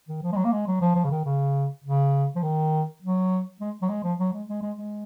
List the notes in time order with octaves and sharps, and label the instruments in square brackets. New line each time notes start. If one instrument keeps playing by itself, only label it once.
[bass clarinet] D#3
F3
G#3
F#3
A#3
G#3
F#3
F3
F3
C#3
D#3
C#3
C#3
F3
D#3
F#3
G#3
F#3
G#3
F3
F#3
G#3
G#3
G#3
G#3